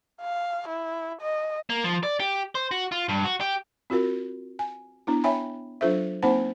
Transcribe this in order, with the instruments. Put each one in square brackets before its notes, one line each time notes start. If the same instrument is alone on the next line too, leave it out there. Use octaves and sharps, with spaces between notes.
[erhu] F5
E4
D#5
[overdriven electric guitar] A#3
F3
D5
G4
C5
F#4
F4
G2
F#4
G4
[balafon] C4 F4 F#4 A#4
G#5
B3 D4 E4
C#5 E5 G5 G#5 B5
F#3 D4 F4 A4 C5 E5
A#3 C4 D#4 C5 F#5 A5